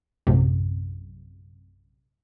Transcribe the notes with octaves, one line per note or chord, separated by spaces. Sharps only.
A#1 F#2 A2 C3